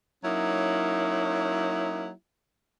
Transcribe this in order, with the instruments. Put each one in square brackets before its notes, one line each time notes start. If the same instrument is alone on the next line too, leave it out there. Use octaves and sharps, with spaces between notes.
[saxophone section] F#3 A#3 C#4 D#4 E4